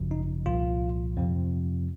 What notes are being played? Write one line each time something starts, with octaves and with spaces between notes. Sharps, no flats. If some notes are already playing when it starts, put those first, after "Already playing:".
Already playing: G#1 F#2 C#3 F3
D#4
C2 A#2 F3 F4
F2 C3 F3